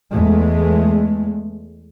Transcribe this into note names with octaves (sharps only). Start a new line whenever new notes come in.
E2 G#3 A3